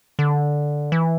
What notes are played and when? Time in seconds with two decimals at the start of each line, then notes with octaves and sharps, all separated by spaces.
0.19 D3
0.92 E3